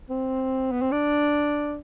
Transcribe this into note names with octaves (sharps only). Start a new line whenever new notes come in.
C4
B3
C4
D4